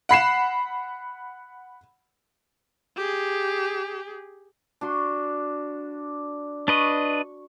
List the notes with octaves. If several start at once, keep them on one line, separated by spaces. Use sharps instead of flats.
F#5 B5 C7 E7
G4 G#4
D4 F#4 C6
D4 B4 D#5 C#6